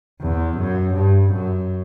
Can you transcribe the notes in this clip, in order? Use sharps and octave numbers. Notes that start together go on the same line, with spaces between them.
E2
F#2
G2
F#2